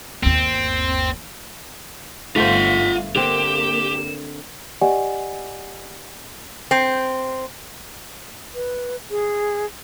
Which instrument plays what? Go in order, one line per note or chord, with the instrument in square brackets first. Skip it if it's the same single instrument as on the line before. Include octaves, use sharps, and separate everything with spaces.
[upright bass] G1 D#2 [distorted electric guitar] C4
[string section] G1 F5 [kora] A3 C5 [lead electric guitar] F4 F#5 [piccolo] B6
[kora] D3 C4 [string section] A#3 [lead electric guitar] G4 [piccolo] E7
[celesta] G4 D5 D#5 F#5 G#5
[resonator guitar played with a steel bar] C4
[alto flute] B4
G#4